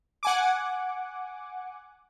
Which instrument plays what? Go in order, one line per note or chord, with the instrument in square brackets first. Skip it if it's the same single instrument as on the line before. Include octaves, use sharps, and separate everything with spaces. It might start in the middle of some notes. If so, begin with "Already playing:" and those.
[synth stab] F#5 G#5 D6